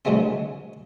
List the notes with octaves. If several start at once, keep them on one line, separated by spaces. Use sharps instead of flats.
B2 D3 F#3 G#3 A3 C4